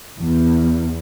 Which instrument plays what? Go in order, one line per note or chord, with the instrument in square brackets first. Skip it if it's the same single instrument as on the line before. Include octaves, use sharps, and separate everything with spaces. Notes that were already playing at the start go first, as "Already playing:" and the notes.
[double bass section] E2